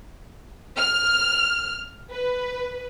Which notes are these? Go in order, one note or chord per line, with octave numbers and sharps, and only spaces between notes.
F6
B4